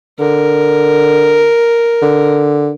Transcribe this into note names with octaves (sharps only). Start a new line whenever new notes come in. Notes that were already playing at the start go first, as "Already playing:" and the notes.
D3 A#4
D3